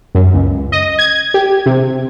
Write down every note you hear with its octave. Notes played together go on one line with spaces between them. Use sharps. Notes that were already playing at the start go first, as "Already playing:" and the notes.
F#2
C#2
D#5
G#6
G4
C3